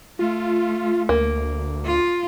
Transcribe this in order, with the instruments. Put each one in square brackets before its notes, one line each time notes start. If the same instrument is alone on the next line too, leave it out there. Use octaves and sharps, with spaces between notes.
[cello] A3 [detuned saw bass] F4
[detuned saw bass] D2 [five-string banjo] A#3
[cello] F4